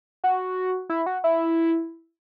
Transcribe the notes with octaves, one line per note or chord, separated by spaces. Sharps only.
F#4
E4
F#4
E4